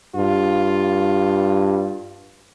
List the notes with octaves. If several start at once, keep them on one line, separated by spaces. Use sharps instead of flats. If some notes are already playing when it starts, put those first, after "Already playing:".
G2 F4